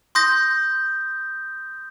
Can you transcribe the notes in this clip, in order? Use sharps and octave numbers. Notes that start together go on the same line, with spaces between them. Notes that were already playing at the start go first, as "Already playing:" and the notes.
C6 D#6 G6 A#6